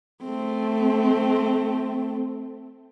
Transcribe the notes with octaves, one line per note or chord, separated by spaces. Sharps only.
A3 C4